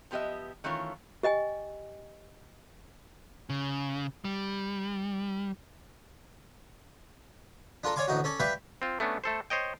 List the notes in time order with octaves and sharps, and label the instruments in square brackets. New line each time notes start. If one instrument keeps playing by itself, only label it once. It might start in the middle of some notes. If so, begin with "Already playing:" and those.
[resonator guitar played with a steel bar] F3 B3 G4 D#5 E5
D#3 E3 A3 C#4 F4 C#5
[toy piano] G4 D#5 G5 G#5
[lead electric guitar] C#3
G3
[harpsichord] D4 F4 A4 A#4
C#5 D5 F5 G#5 C6 D6
A1 D2 D#4 F#4
C#4 A4 D5
G4 B4 D5 E5 F5 G5
[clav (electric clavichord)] C4 F4
A3 B3 C#4 D4
A3 A4 C5
C5 C#5 D#5 G5